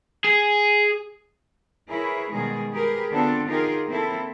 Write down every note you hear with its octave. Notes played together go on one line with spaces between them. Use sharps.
G#4
E4 G#4 A#4 B4 C#5
B2 D#3 G3 G#3 G#4
G4 G#4 A#4 B4
D3 B3 C4 D4 F4 A4
D#4 F4 G4 G#4 A#4
A#3 C4 E4 A4